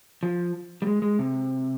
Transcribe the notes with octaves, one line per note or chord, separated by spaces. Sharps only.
F3
G3
G#3
G#3
C3